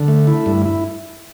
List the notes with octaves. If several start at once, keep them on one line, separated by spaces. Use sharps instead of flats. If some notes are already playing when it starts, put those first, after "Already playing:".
Already playing: D3
A3
E4
G2
E4